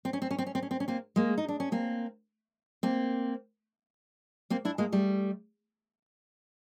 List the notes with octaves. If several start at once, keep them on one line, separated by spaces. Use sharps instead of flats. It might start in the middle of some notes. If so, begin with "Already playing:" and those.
C4
C#4
C4
C#4
C4
C#4
C4
C#4
C4
C#4
A#3 C4
G#3 A#3
D#4
D4
C#4
A#3 C4
A#3 C4
A#3 C4
D4 E4
G#3 A#3
G3 A3